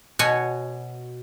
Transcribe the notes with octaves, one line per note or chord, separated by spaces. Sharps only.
B2 F#4 C#5 G#5